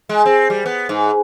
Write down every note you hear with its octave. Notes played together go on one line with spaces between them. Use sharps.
G#3
C4
G3
B3
G#2